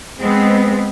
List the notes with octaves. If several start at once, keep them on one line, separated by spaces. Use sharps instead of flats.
G#3 B3 C4